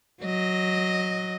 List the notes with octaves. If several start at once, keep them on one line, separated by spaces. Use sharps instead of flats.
F#3 D#5